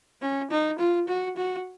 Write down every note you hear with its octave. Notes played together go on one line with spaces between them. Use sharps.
C#4
D#4
F4
F#4
F#4